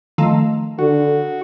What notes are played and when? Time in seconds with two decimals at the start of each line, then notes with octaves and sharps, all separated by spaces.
0.18 D#3 F3 A3
0.79 D3 F#4